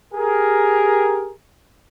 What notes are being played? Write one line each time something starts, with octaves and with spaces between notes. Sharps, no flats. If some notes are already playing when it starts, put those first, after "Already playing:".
G4 G#4 A#4